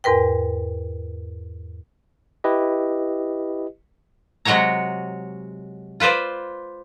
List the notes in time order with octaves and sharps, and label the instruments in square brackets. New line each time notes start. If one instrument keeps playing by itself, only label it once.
[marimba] E2 G#2 A#4 B4 G5
[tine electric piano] E4 G4 B4 D#5
[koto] C3 F#3 G#3 F#4 C#5 A#5
F4 B4 C5 D5 F5